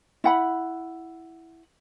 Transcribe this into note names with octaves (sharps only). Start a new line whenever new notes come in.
E4 F#5 B5